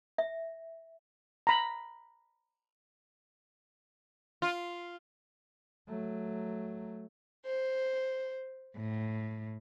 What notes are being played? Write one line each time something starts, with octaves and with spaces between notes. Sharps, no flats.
E5
A#5 B5
F4
F#3 A3
C5
A2